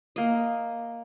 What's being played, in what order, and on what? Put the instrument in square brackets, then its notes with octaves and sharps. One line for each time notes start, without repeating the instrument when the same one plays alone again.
[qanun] A#3 D#5